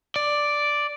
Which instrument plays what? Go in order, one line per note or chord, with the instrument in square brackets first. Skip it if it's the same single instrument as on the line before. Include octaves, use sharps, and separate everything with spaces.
[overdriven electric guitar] D5